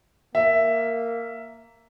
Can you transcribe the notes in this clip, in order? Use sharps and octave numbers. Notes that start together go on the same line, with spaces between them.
A#3 E5